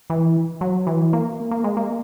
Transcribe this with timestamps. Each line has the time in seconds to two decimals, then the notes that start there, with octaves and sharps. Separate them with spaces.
0.10 E3
0.61 F#3
0.87 E3
1.13 A#3
1.51 A#3
1.64 G#3
1.77 A#3